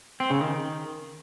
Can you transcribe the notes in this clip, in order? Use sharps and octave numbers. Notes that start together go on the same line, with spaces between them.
C4
C#3
D#3